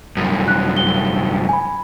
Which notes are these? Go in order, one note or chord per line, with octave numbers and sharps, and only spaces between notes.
C2 F#2
F#6
G7
G#5 B5